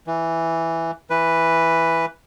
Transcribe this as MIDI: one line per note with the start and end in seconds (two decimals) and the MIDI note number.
0.07 0.91 52
1.10 2.06 52
1.10 2.06 71